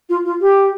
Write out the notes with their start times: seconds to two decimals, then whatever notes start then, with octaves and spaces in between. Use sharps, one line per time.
0.09 F4
0.25 F4
0.41 G4